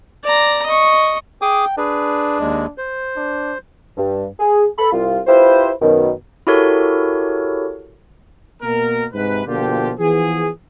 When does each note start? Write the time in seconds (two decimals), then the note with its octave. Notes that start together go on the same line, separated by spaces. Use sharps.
0.24 D5 A#5
0.66 D#5 C#6
1.42 G#4 G5 D6 D#6
1.77 D4 G#4 B4
2.39 D#2 G#3
2.78 C5
3.17 D4
3.97 G2
4.39 G#4
4.78 A4 B5
4.92 C2 F4
5.26 E4 F4 G4 B4 C5
5.81 F#2 B2 D#3
6.47 E4 F#4 G4 A4 A#4 C#5
8.63 B2 A#3 A#4
9.14 G#2 C3 B4
9.46 B2 D3 F3 A#3 F4 G4
9.98 E3 F3 B3 G#4